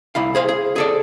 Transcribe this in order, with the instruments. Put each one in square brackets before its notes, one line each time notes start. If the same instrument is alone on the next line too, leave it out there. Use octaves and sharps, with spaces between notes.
[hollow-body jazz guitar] C2 E4 F5
G#4 C5 F5
G#4
G#4 A4 D5